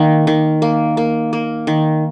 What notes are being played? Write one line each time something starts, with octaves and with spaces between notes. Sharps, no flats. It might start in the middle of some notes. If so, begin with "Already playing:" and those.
Already playing: D#3 A#3
D#3
A#3
A#3
A#3
D#3